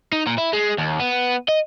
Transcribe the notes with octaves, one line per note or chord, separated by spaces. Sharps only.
D#4
A#2
E4
G#3
D#2
B3
D#5